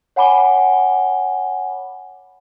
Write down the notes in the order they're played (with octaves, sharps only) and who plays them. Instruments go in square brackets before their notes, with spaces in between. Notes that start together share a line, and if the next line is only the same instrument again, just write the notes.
[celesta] C#5 F#5 G#5 B5 D6 G7